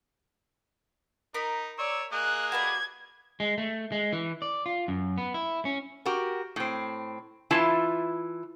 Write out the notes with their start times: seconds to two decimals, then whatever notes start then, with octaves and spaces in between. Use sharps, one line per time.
1.34 D#4 A#4 B5
1.78 C#5 D5 E6
2.12 A#3 G#4 D#5 F#6
2.52 F#4 B4 D5 G#6
3.40 G#3
3.58 A3
3.92 G#3
4.13 E3
4.42 D5
4.66 F4
4.88 F#2
5.18 B3
5.34 E4
5.65 C#4
6.06 F#4 G4 A#4
6.56 A2 C4
7.51 E3 E4 F4 A5